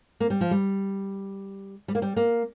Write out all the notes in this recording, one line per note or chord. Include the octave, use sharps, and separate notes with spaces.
A#3
G3
F3
G3
G3
A#3
G3
A#3